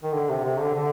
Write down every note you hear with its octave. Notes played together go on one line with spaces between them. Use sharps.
D#3
D3
C3
C3
D3
D3